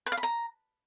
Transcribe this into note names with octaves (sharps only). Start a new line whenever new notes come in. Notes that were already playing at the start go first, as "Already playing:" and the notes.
B4
F5
B5
A#5